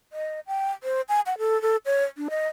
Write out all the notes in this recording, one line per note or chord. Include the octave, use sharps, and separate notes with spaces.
D#5
G5
C5
G#5
F#5
A4
A4
C#5
D4
D#5